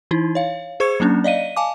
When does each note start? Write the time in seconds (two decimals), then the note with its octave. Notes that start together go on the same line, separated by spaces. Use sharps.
0.11 E3 D#4 E4
0.35 C#5 F5
0.80 G#4 C5 C#6 G#6 C#7
1.00 F#3 A#3 C#4 D4
1.24 D5 D#5 F5 D#7
1.56 F5 G#5 A5 D6